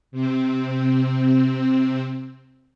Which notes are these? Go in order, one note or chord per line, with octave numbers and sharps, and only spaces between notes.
C3 C4